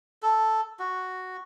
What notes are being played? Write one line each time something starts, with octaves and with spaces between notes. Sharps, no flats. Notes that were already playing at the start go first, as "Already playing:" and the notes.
A4
F#4